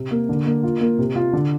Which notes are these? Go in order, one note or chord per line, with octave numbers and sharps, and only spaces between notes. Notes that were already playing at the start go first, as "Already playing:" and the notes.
Already playing: C3
A#3
D3
A#3
F4
A#3
C3
F4
D3